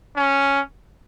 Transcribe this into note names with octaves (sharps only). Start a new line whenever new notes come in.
C#4